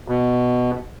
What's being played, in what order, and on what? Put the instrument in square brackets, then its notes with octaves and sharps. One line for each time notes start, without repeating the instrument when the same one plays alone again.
[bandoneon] B2